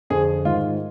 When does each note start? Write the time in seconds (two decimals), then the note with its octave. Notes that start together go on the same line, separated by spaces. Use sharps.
0.10 F2 D3 G#4
0.45 G#2 D#3 F4